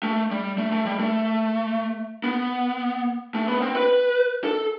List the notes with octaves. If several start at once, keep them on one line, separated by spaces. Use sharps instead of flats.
A3
G3
A3
A3
G3
A3
B3
A3
B3
C4
B4
A4